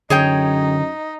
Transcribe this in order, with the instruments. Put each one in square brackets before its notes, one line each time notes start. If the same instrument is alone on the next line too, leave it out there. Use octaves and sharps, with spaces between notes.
[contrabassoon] F#2 [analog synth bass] D3 [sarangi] D#4 [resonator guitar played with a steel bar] G#4 C#5 G5